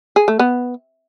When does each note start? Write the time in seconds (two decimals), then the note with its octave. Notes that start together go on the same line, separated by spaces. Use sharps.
0.16 G#4
0.28 A3
0.39 B3